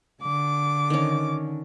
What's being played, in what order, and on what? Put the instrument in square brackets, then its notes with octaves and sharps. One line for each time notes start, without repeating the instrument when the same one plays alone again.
[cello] D3 [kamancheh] D6
[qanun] D#3 C#4